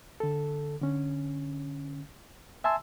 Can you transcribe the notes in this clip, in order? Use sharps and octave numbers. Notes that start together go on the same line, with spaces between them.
D3 A4
D3 C#4
E5 G#5 A5 C6 E6